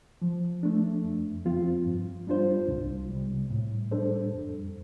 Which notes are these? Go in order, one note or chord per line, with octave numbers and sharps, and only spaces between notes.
F3
A3 D4
F2
F3 C4 F4
G2
G3 D4 F4 C5
C2
C3 G3
A2
G3 D4 A4 C5
F2